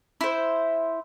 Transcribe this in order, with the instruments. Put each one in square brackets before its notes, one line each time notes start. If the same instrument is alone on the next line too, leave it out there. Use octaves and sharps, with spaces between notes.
[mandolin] E4 C5